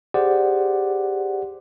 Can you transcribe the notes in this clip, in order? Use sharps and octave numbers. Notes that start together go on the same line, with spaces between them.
G4 G#4 C5 D5 F#5